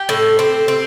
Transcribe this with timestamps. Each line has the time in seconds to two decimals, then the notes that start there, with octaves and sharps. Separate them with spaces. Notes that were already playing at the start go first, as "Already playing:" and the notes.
Already playing: G4
0.09 A2
0.39 C4
0.68 C4